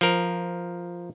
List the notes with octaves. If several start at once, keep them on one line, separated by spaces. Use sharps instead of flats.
F3 A#4